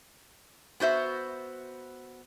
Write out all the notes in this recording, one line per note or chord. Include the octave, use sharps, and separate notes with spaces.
B3 F#4 C5 E5